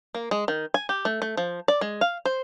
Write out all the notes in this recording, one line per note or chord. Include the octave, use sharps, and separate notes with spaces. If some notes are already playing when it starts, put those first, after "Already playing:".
A#3
G#3
D#3
G#5
G4
A3
A3
F3
D5
G#3
F5
C5